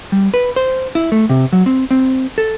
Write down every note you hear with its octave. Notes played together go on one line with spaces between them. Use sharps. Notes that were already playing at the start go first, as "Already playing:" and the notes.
G3
B4
C5
E4
A3
C3
F#3
C4
C4
A4